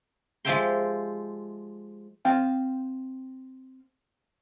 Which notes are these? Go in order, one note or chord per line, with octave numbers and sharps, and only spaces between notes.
F3 G#3 G4 E5 G5 C6
C4 F5 G5